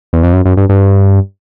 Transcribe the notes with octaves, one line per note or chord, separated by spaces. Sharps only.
E2
F2
F#2
F#2
G2
G2